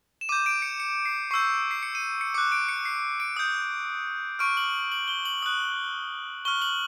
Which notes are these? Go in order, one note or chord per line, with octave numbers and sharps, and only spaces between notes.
E7
D6 G6 D#7
D7
C#7
C#7
C7
C#6 E6 G6 C7
C7
C#7
D#7
C#7
D6 F#6 C#7
D7
C#7
C7
D7
D#6 G6
C#6 F6 D7
F#7
F#7
G7
F#7
D#6 F#6
C#6 F6 G7
F#7